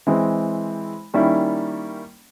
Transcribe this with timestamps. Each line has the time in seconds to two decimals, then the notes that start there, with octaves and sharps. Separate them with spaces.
0.07 E3 G#3 C4
1.14 D#3 G3 A#3 C#4 E4